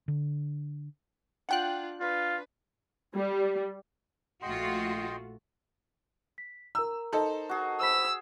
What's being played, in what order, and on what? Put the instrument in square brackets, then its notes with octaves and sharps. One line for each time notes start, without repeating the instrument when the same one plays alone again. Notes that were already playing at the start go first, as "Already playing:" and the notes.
[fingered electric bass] D3
[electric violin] D4 F4 [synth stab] F#5 G5 F#6
[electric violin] D4 B4 [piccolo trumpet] F4
[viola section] G3
[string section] A#1 A3 [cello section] F4 F#4 [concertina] D#5 G5 C6
[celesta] B6
[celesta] A#4 A#5 [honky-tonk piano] E6
[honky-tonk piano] D#4 A4 [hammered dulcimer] C5
[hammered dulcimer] F#4 G#4
[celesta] C5 B5 B6 [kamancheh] E6